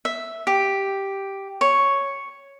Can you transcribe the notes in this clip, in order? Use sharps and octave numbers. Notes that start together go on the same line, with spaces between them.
E5
G4
C#5